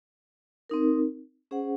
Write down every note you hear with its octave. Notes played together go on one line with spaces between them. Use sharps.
C4 D#4 A#4
C#4 G#4 C5 F#5